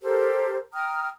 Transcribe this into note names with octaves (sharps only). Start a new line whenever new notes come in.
G4 A4 A#4 C5
G5 A#5 D#6 F6